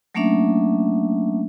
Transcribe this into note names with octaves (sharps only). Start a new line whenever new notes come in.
F#3 A3 A#3 C#4 D4 E5